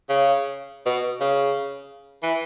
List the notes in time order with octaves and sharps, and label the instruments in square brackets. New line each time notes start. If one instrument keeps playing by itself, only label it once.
[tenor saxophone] C#3
B2
C#3
E3